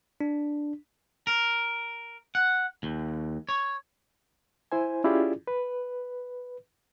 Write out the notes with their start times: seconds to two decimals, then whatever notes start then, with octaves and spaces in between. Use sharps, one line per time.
0.21 D4
1.27 A#4
2.35 F#5
2.83 D#2
3.49 C#5
4.72 E4 C5 G#5
5.04 C#4 E4 F4 G4 G#4 D5
5.47 B4